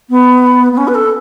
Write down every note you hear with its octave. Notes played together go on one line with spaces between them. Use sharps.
B3
B3
C#4
B4
A4